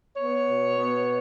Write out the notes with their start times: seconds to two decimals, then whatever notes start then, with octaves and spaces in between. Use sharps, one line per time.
0.16 B3 C#5
0.47 B2
0.77 B3